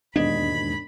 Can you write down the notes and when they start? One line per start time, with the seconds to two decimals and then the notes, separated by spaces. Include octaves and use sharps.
0.16 E1 D#2 G#2 D4 D#5 B5 G#6